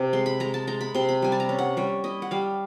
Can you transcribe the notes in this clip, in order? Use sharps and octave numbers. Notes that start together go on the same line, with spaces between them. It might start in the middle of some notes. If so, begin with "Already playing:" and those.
Already playing: C3
G#3 C6
B5
G#3 A#5
A5
G#3 A#5
B5
C3 C6
B5
G3 G#5
A5
A#5
C#4
F#5
G3 C#5
E4 D#5
F#5
G3 F5